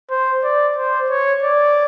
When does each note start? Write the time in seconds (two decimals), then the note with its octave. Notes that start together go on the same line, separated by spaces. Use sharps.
0.10 C5
0.44 D5
0.76 C5
1.10 C#5
1.43 D5